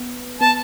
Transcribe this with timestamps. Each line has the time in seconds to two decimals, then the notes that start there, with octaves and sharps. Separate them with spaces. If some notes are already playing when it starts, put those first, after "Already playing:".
Already playing: B3
0.41 B3 A5